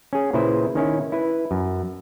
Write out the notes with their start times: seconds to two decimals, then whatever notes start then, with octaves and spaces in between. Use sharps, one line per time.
0.13 C#4 G#4
0.33 A#2 C#3 E4 B4 C5
0.75 D#3 C#4 E4
1.12 E4 B4
1.51 F#2